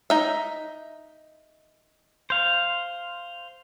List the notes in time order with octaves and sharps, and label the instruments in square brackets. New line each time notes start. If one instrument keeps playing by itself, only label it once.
[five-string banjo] D#4 E5
[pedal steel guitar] C5 F5